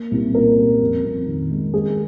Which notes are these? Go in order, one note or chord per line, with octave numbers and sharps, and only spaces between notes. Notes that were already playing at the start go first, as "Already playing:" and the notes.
Already playing: A#3
C2
A#2 A#4
G3
F2
F2
D#3
G#3
G#3 G#4